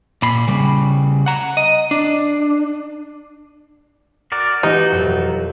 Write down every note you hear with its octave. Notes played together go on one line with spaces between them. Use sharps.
A#2 B5
C#3 G3
F#5 A#5
D#5
D4
F#4 A#4 D5
E3 D#4 F#4 G4
E1 F2 F#3